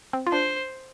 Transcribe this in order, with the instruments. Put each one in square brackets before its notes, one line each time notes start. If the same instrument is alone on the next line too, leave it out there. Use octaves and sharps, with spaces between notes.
[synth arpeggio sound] C4
F4
[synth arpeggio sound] D4 [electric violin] C5